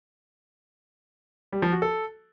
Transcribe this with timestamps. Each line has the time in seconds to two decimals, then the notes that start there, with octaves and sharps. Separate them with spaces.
1.53 G3
1.62 F3
1.72 F#4
1.82 A4